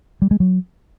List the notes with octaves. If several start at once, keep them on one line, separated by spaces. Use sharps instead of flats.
G3
G#3
F#3